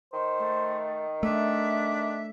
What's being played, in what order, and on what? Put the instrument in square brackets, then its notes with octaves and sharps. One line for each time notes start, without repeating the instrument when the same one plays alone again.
[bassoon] D#3 [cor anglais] C5
[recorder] A3
[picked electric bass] A3 [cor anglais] D4 [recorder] E5